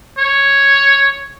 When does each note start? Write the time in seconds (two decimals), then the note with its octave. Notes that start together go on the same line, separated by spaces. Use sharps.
0.18 C#5